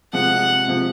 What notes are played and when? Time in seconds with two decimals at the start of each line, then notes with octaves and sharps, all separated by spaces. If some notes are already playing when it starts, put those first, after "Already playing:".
0.13 C3 F3 G#3 F#5
0.68 C3 F3 G#3